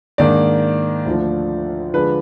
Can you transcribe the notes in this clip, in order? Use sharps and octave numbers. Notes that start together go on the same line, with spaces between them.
G#2 D#3 A#3 D4 D5
D2 D3 F3
D3 F3 G#3 D4 B4